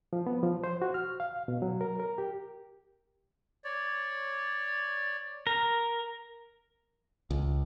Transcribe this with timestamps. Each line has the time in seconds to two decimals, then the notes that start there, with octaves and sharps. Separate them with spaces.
0.13 F3
0.27 B3
0.43 F3
0.64 C5
0.82 F#4
0.94 F6
1.20 F5
1.48 B2
1.62 F#3
1.81 A#4
2.00 A#4
2.18 G4
3.65 C#5 D5
5.47 A#4
7.31 C#2